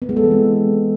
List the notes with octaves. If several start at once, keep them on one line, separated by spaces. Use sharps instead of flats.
B3
G#3
A4
E3
C4